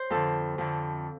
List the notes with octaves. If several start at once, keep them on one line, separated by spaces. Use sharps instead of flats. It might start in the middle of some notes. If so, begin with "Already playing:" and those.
Already playing: C5
F2 D3 A4
F2 D3